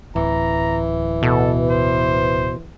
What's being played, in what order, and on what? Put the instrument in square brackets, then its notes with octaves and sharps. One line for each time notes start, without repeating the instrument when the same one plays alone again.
[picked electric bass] D1 [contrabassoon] E3 [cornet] A#5
[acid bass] B2 [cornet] A4
[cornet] C5